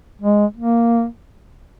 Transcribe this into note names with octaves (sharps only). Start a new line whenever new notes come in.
G#3
A#3